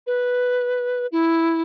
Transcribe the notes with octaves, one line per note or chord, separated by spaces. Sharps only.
B4
E4